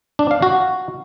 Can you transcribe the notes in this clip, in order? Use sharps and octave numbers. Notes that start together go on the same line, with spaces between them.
D4
F5
F#4